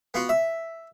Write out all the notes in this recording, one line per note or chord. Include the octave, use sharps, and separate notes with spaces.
B3 F4 F#4
E5